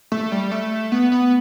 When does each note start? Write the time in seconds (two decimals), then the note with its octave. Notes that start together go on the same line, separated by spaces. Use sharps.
0.12 A3
0.32 G3
0.51 A3
0.92 B3
1.12 B3